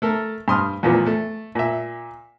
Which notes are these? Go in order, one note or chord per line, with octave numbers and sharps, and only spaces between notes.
A3 A4 A#4
G2 C6 D#6 F6
E2 A#2 F3 B3
A3
A#2 E5